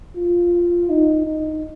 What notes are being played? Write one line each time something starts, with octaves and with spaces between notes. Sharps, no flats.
F4
D#4
D#4